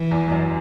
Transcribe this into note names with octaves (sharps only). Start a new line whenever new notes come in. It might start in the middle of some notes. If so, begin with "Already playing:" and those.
Already playing: E3
E2
E2
F#2